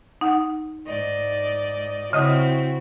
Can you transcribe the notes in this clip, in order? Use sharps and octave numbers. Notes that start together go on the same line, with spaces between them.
D#4 F#5
G#2 D5 D#5
C#3 C4 E4 F#4 D#5 D#6